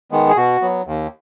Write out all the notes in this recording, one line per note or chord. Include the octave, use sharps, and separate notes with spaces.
D#3 G#3 B3
G#4
B2 F#4
F#3 B3
D#2